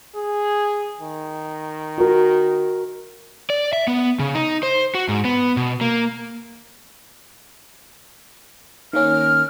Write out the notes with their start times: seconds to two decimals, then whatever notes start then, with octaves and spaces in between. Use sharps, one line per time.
0.16 G#4
1.01 D#3
1.98 F#4 A#4
3.50 D5
3.73 E5
3.87 B3
4.19 C#3
4.35 D#4
4.63 C5
4.95 F#4
5.08 G#2
5.25 B3
5.57 B2
5.81 A#3
8.93 D#3 A#3 C#4 F6